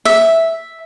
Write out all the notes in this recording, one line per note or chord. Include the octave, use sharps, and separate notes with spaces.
E5